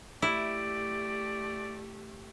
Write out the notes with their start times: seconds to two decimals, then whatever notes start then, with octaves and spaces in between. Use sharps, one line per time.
0.22 A3 E4 G4 D5